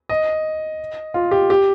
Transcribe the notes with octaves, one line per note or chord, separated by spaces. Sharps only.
D#5
F4
G4
G4